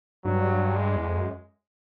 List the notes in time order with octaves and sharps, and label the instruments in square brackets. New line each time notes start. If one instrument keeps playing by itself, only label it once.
[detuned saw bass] G2 [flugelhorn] F#3
[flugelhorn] G#3
[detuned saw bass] E2
F2
F#2